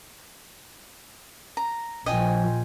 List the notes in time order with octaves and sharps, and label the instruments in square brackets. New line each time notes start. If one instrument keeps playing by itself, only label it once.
[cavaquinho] A#5
[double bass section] A#1 A#2 F3 [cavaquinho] D#5 G5 G#5